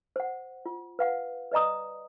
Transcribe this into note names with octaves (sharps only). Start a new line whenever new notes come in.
C5 F#5
F4
B4 F5 F#5
B4 D5 D#5 A#5 D#6